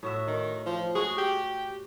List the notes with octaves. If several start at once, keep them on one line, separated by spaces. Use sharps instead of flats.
A2 F#4 E5
D#3
F3
F#4 G#4
G4